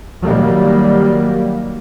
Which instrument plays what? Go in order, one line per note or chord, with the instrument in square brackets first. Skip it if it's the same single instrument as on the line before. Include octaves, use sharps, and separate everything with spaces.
[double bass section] D#3 F#3 G3 A#3